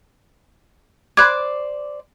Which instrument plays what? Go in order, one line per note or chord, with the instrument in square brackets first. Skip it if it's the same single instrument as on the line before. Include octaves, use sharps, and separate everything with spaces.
[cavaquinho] C5 D5 D6 [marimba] B5 F#6 G#6